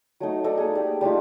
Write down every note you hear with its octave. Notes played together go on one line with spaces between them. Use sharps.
F#3 A3 D#4
D#4 A4 D5 D#5
A#3 G#4
G4 D5
G3 A3 D#4 F4